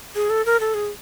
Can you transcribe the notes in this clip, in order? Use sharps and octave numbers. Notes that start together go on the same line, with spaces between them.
G#4
A4
A#4
A4
G#4